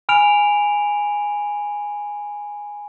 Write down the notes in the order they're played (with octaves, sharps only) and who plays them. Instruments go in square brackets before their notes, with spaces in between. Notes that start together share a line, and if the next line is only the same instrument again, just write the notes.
[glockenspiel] G#5 B5 F6 D7 F7